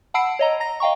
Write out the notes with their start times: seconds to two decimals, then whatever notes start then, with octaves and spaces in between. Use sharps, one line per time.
0.14 F#5 A5 B5 E6 C7 D7
0.39 C#5 D#5 A#5
0.60 A#5 A#6
0.80 D#5 F5 G5 A#5 C#6